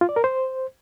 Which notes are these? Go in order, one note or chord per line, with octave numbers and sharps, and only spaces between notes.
F4
D5
A#4
C5